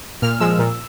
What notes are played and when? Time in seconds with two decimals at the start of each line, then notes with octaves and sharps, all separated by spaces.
0.22 A#2 F6
0.40 F3 G#3 E6
0.59 A#2